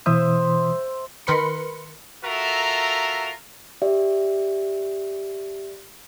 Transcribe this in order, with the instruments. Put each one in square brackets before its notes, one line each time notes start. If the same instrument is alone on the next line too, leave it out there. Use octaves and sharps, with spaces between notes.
[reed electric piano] B2 E3 D#6 [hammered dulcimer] C5 E5
[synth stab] D#3 A#4 B4 B5 C6 C#7
[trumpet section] F4 F#4 A4 A#4 E5 A#5
[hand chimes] G4 D5 E5